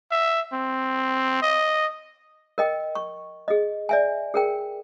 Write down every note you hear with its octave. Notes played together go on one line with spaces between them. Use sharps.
E5
C4
D#5
A#4 D#5 G5
C#6
G#4 D#5
D5 E5 G#5
G#4 A#4 G5